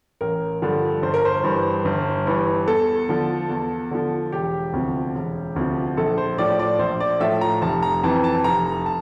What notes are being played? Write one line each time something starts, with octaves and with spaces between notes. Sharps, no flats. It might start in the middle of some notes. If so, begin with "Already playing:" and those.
A1 A#4
G2 D3 F3
G1 C5
A#4
C5
G2 E3
G1
G2 E3
E2 A4
D3 F3
E2
D3 F3
E1 G4
D2 C3 F3
E1
D2 C3 F3
A#1 A4
C5
A2 F3 D5
D5
A#1 C5
D5
A2 F3 E5
A#5
F1 A5
A#5
F2 E3 A5
A5
F1 A#5
A5